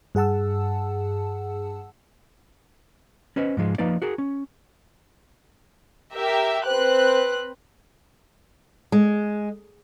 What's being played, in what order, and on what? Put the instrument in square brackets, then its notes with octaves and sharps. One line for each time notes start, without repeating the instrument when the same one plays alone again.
[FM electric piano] G2 G#4 F#5 A5 E6
[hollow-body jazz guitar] C#4 B4 C5 D#5
G#2 F3 G#3
F3 A#3 D#4 B4 D5
F#4 G#4 A#4
C#4
[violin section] G4 A#4 E5
[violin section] C4 B4 F#6 [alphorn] C5
[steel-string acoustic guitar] G#3